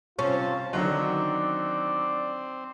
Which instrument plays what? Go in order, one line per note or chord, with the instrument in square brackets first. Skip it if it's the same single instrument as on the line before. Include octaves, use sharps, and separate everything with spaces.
[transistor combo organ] C3 A5 [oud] C#4 [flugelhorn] F4
[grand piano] D3 D#3 F#3 [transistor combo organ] C4 [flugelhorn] D5